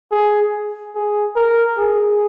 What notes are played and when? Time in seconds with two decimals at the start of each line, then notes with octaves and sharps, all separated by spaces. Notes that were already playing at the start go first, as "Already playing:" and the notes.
0.11 G#4
0.95 G#4
1.36 A#4
1.78 G#4